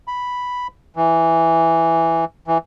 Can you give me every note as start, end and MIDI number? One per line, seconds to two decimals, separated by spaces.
0.08 0.67 83
0.96 2.25 52
2.47 2.58 52